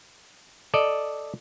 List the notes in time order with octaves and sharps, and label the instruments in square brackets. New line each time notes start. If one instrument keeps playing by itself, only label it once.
[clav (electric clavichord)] A4 D5 D#5